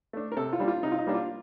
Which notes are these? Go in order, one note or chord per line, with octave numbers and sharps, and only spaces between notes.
A3 D4
A#4
C3 A4
F4
G3 A#3 D4
F4
C3 D#4
F4
D#4
G3 A#3 D4
F4